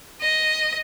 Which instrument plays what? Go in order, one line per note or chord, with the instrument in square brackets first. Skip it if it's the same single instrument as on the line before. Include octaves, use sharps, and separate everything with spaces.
[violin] D#5